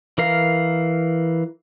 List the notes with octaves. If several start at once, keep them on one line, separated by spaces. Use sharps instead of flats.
E3 A#4 F5